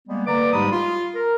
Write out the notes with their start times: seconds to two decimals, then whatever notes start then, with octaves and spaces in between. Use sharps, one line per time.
0.07 G3 G#3 A#3 B3
0.26 D3 A#3 B4 D5 A#5 D6
0.53 G#2 G3 G#3 G4 B5 D#6
0.72 F4
1.16 A#4